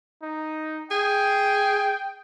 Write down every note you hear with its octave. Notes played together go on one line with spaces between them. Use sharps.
D#4
G#4 G5